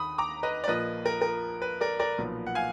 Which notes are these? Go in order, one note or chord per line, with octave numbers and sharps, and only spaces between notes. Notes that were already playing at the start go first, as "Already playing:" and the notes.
Already playing: D#2 D#3 B5 D#6
A#5 D6
B4 D#5
D5
A#1 A#2 F3 A#3 B4 D#5
A#4
A#4
B4
A#4 D5
A#4 D5
B1 A#2 F3 B3
F#5
F5 G#5